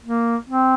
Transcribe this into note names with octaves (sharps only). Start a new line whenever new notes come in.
A#3
C4